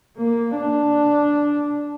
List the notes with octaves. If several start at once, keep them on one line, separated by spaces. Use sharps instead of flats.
A#3
D4